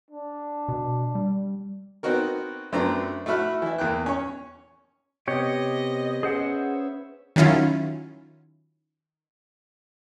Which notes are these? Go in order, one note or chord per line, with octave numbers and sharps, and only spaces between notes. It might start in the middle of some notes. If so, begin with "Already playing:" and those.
D4
B2
G3
B3 C4 D#4 F#4 A#4
F#2 A3 B3 C4 D4 A#5
A3 E4 F#4 E5 B5 F6
E3 E4
E2 A#3 G5 F#6
C#4 C#5
C3 B3 G4 C#5 D#5
C#4 G#4 B4 C5 E5 F#5
D#3 F#3 C#4 E4 F4